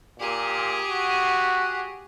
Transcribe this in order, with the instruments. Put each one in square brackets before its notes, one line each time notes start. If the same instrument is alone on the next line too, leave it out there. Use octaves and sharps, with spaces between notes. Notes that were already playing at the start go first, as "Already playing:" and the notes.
[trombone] A#2 [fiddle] G4 G#4
[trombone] F#4